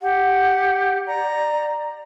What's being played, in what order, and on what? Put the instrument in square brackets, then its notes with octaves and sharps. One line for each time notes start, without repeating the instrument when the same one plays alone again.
[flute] G4 [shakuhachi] F#5
[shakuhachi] D5 [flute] A#5